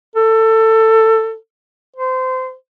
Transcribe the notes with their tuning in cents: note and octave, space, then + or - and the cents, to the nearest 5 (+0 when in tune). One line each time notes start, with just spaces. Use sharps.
A4 +20
C5 -25